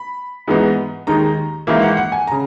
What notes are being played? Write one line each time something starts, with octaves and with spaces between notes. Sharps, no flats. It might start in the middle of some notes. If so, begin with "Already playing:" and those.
Already playing: B5
G#2 E3 G#3 B3 D#4
D#2 D#3 G#3 D#4 A#5
G#1 G#2 E3 A#3 E5
F#5
F#5
G#5
C#3 A#5